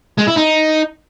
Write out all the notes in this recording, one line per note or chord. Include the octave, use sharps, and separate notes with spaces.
G#3
E4
D#4